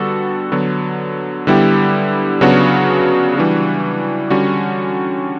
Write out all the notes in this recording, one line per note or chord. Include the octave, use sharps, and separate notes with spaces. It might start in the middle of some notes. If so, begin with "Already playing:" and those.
Already playing: D3 G3 B3 F#4 A4
D3 F#3 B3
D3 G3 B3 E4 G4
C#3 F#3 B3 D4 F#4
E3 G3 D4 F#4
D3 G3 C#4 F#4